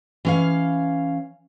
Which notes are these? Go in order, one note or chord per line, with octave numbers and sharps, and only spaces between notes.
E3 C#4 F5